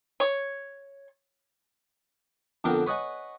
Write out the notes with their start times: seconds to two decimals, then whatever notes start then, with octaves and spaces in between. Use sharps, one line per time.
0.20 C#5
2.64 F2 D3 B3 A#4 G5
2.86 B4 C#5 D#5 F#5 G#5